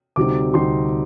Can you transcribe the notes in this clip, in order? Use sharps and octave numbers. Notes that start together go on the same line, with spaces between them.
D2 C3 G3 C4 D#4 D6
D2 C3 G3 C4 D#4 C6